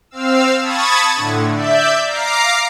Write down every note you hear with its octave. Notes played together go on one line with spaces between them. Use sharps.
C4 F5 E6
A5 B5 C#6 D#6 G#6 A6
A2 D3
D5 E5 G6
F5 A#5 D6 C7